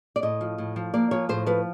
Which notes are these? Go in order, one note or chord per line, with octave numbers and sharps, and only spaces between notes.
D5
A2 D#5
F3
A2
F3
A#3 D5
F3 C#5
A2 C5
F3 B4